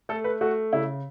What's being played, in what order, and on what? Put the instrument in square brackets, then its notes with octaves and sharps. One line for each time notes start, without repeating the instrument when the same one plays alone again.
[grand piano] A3 A4
B4
A3 F#4
C#3 E4